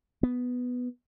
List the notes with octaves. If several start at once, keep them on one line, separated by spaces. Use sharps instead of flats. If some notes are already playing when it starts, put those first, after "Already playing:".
B3